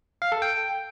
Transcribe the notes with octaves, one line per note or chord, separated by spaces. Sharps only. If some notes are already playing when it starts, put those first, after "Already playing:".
F5
A4
G5